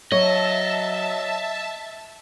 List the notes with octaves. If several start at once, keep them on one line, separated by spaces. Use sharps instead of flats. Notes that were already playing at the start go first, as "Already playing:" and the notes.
F#3 C#5 D#5 E5 A5